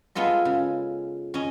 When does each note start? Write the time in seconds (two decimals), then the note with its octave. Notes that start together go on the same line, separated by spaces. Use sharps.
0.15 G#3 B3 F4 A4 D#5
0.45 C#3
1.34 C#4 D#5